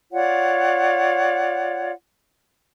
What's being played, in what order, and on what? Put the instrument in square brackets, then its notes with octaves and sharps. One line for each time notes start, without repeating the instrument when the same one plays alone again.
[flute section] F4 C#5 D5 F#5